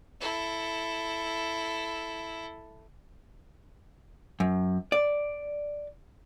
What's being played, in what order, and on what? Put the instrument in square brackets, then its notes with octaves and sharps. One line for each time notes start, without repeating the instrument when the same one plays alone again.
[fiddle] E4 A4
[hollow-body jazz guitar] F#2
D5